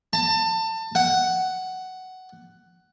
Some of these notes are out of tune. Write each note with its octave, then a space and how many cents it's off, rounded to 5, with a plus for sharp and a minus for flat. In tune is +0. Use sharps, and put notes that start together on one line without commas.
A5 +30
F#5 +10